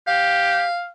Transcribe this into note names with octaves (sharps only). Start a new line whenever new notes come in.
G4 F5